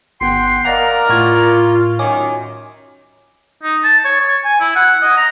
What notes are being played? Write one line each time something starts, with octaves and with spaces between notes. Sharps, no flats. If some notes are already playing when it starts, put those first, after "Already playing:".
G1 B3 F#5 G5 C6
A#4 D5 D#5 F5 F#5 A#5
A2 F4 C#6 G#6
F#2 D#3 C#5 G#5 D6
D#4
A5
C#5
C#5
G#5
E4
F#5
D#5
A#5